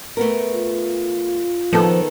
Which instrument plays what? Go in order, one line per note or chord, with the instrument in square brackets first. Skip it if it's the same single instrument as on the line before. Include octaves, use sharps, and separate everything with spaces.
[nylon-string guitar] A3 B3 A#4
[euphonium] F4
[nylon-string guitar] D#3 B3 A4 [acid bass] F3